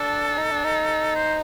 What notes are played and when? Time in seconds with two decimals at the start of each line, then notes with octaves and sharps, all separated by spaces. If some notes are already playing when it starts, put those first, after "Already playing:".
Already playing: D4 A4
0.37 D#4
0.51 D4
0.64 D#4
1.15 C5